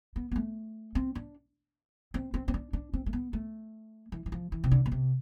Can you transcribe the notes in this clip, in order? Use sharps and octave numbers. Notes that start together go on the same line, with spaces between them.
B3
B3
A3
C4
D4
C4
C4
C4
D4
D4
C4
A3
B3
A3
E3
E3
F3
E3
C3
D3
B2
C3